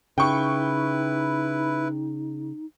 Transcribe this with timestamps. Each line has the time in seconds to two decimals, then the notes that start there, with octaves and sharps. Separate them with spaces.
0.18 C#3 D#4 E4 B4 G5 C#6